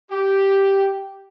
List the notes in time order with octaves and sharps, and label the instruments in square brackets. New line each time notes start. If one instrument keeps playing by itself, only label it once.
[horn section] G4